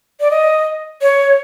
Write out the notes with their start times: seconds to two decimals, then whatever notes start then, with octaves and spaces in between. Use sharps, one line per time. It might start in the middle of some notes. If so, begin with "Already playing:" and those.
0.20 D5
0.31 D#5
1.02 C#5